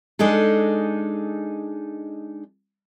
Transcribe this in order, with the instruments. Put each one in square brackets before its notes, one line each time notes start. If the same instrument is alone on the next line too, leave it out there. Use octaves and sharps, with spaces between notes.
[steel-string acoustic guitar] G#3 D4 D#4 G#4 A4